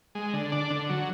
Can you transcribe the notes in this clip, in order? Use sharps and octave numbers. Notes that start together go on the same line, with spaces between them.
G#3
D3
D4
D3
F#3